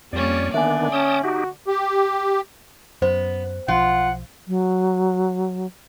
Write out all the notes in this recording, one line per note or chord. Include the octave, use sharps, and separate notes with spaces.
F2 G3 A#3 C#4 D5
D3 D#3 B3 D4 D5 E5 G#5
C#4 G5 A5 D#6
D#4 F#4 G4
G4
F#2 B3 C5
B1 F3 F4 F#5
F#3